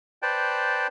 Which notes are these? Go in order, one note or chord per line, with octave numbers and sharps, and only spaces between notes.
B4 C5 D5 G5 A5